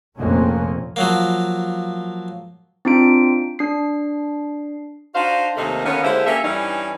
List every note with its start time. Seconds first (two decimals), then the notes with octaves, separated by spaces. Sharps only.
0.18 F1 A#1 F2 A#3 C#4
0.96 F3 F#3 A#3
2.85 C4 D4 D#4 F4 D7
3.59 D4 C7
5.15 D4 D#4 F#4 C5 F5
5.57 D#2 C3 A3 A#3 D#4
5.85 D3 D#3 A#3 B3 C#4
6.03 D3 G#3 A#3 E4 G4 C5
6.26 A#3 C#4 G4 A4 E5
6.44 G2 E3 G3 C#4 D#4